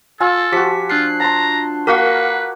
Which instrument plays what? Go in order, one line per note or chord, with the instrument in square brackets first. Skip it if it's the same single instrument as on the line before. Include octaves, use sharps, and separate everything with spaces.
[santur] F4 G#5 E6 [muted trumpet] A4
[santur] F3 F#4 [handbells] G4 B6
[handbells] D4 F#6 C7 [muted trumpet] F4
[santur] A5 C6 [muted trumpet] A#5
[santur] A#3 F#4 [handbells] A#4 F5 F#5 [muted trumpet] B4